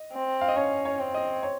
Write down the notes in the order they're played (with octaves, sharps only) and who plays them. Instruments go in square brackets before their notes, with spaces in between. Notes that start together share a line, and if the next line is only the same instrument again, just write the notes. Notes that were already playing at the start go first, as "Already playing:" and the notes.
Already playing: [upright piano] D#5
[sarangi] C4
[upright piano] F5
D#5
[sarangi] C#4 [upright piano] C#5
[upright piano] C#5
[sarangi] C4
[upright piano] D#5
C#5